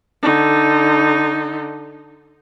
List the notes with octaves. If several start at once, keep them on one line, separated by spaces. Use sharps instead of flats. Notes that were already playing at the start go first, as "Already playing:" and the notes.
D3 D#4